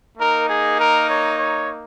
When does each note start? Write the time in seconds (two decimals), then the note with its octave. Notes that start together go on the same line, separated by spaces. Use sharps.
0.18 A#3 D#4 A#4
0.48 G#4
0.77 A#4
1.06 C#5
1.36 C#5